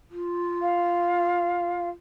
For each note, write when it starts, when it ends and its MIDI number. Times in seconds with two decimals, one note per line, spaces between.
0.11 1.90 65
0.62 1.89 77